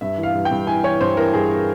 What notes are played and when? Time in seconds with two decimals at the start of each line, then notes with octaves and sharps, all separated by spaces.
0.01 G2 E5
0.18 E3
0.23 F5
0.34 G2
0.45 G5
0.51 G2
0.67 E3 G#5
0.84 E3 C#5
1.01 G2 C5
1.17 E3 A#4
1.33 G2 G#4